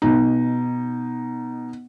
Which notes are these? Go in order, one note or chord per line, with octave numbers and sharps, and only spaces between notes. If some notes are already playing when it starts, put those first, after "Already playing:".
B2 D#4